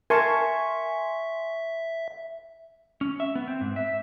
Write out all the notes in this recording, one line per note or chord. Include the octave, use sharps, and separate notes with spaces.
A#4 E5 G#5 A5 C6 C#6
C#4
E5
B3
C4
G#2
E5